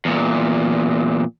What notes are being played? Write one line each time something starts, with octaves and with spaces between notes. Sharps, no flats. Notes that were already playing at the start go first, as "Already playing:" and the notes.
E2 A#2